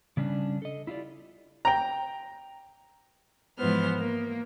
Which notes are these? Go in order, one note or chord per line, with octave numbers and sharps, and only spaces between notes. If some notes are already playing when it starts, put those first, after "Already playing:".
C#3 G3 C#4 D4
A4 D#5
E4 F4 G4 D5
G5 A#5
G#2 E3 F3 B3 C5 F6
A#3